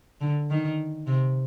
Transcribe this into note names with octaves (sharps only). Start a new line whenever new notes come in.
D3
D#3
C3